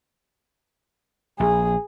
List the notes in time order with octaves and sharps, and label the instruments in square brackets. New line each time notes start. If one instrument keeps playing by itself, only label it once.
[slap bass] A#1 [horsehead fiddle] G#4